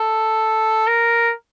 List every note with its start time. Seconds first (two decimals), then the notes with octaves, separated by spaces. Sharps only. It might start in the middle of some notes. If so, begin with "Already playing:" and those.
Already playing: A4
0.87 A#4